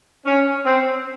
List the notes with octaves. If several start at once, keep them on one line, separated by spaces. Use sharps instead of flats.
C#4
C4